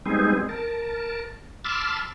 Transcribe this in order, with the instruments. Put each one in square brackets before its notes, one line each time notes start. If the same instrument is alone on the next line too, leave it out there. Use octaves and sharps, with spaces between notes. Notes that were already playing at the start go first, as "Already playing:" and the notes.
[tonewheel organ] G3 G#3 B3 C4 D#4 G#4
A#4 A5
A5 B5 C6 D6 E6 F6